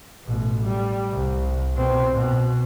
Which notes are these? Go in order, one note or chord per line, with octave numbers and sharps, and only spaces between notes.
A1 B2
G3
C2
B2 C4
B2